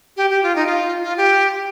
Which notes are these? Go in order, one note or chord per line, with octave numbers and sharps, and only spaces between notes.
G4
G4
F4
D#4
F4
F4
G4